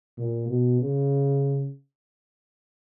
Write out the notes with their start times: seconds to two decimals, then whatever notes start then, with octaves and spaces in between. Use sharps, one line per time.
0.18 A#2
0.49 B2
0.80 C#3